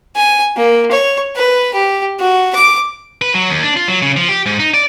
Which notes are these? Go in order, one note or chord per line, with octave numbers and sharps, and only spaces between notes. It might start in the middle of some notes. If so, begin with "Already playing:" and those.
G#5
A#3
C#5
B4
G4
F#4
D6
B4
F#3
D#2
D4
F4
F#3
C#3
F3
G4
G#2
D#4
D5